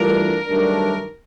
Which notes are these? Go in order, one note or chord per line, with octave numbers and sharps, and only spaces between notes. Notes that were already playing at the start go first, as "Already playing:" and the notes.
Already playing: G2 E3 A3 D4 F4 A#4
G2 D#3 F#3 A3 D4